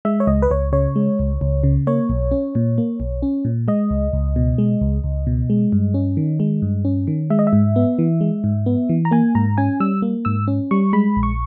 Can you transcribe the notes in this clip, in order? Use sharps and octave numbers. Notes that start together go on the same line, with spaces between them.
G#3 E5
C#5
C#2 D#5
B4
C#2 C#5
C#3 C#5
G#3
C#2
C#2
C#3
A#3 C#5
B1
C#4
A#2
A#3
B1
C#4
A#2
G#3 D#5
C#2
C#2
B2
G#3
C#2
C#2
B2
G#3
G2
C#4
D#3
G#3
G2
C#4
D#3
G#3 E5
D#5
E5
G#2
B3
E3
G#3
G#2
B3
E3
A#5
A#3 G#5
G#2 A#5
C#4 G#5
G3 E6
A#3
G#2 E6
C#4
G3 C#6
G#3 B5
A#1
C#6